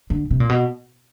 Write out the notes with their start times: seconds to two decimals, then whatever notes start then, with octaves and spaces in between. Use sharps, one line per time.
0.10 D3
0.31 C3
0.40 A#2
0.49 B2